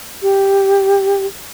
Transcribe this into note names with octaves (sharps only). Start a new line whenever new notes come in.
G4